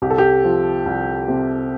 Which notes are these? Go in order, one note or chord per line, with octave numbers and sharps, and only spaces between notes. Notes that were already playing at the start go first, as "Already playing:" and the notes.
C2 G4
A4
G4
F3
C2
C3